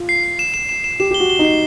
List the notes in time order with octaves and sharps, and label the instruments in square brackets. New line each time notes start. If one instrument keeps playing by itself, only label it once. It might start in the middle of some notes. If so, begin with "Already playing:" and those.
Already playing: [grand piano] F4
[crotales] C7
C7
E7
E7
E7
E7
[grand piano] G4 [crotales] E7
[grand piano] G4 [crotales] G7
[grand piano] F#4
[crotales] G7
[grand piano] D#4
[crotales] C7